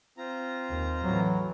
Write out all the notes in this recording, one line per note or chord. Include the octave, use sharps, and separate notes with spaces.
C4 F4 A#5
D#2
A2 E3 F#3